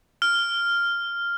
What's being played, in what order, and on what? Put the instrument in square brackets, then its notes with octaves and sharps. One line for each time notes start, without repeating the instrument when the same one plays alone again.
[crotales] F6